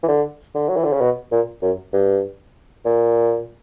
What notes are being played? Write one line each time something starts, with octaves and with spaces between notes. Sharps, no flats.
E3
D3
D3
F#3
E3
D3
C#3
B2
A#2
F#2
G2
A#2